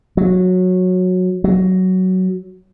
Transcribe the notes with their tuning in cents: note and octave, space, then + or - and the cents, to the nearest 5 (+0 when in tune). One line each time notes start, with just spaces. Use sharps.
F#3 -15
F#3 +10